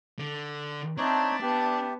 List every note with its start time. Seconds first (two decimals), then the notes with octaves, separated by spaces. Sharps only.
0.19 D3
0.98 C4 D4 D#4 C#5 E5 A5
1.42 B3 G4